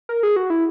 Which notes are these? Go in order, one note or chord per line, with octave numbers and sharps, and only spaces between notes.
A#4
G#4
F#4
E4